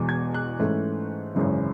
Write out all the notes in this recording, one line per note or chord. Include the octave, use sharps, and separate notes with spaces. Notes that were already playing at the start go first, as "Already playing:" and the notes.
Already playing: E1 E2 B2
G#6
F#6
G#2 E3 A3 C#4
G#1 F#2 C#3 E3